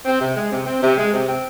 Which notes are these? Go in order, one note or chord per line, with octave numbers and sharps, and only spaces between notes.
C4
C3
G#3
C3
C4
C3
G#3
C3
C4